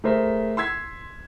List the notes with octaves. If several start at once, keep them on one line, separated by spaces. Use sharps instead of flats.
A3 G#4 A#4 C5 E5
C6 E6 G#6 B6